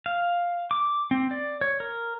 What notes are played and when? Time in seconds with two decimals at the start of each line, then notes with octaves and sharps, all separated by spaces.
0.06 F5
0.71 D6
1.11 C4
1.31 D5
1.61 C#5
1.80 A#4